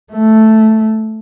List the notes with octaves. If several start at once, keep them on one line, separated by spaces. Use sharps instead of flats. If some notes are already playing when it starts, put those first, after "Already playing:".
A3